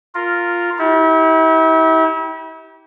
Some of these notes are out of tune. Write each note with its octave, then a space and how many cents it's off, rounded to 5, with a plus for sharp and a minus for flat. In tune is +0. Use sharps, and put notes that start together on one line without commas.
F4 +0 A#4 -10
E4 -40 G4 -15